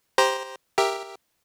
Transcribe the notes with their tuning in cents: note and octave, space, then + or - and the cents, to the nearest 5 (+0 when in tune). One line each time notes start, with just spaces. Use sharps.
G4 +0 C5 +0 A#5 +15
G4 +5 A#4 +0 E5 +0